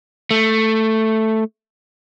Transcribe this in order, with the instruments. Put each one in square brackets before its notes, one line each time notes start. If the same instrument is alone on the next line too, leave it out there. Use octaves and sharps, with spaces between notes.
[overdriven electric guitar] A3